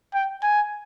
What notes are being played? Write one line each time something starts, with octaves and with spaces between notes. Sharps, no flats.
G5
G#5